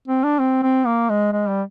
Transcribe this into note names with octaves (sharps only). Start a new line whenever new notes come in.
C4
D4
C4
C4
A#3
G#3
G#3
G3